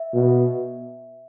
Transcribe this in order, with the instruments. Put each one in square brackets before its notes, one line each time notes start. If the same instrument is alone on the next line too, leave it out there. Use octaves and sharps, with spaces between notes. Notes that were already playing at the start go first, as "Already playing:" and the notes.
Already playing: [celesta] E5
[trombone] B2